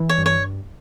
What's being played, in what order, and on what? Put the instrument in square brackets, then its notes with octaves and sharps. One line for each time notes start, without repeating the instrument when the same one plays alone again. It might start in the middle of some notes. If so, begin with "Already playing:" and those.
Already playing: [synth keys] E3
[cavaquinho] C#5
[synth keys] G2
[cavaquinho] C#5